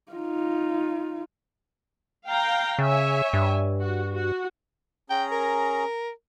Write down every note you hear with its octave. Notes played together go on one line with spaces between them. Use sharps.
D#4 F4
F5 G5 A#5
C#3 C#5 E5 G#5
G2
F#4
F#4
C#4 G#4 G5 A#5
A#4